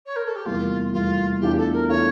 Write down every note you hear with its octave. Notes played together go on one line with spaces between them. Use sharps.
C#5
A#4
A4
G4
F1 E2 E3 G3 A#3 F4
F1 E2 E3 G3 A#3 F4
E2 E3 A3 D4 F4 G4
A4
A#4
E3 A3 D4 F4 C#5